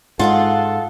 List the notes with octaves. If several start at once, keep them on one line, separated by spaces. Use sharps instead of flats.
G#2 G#3 F4 A4 F5 F#5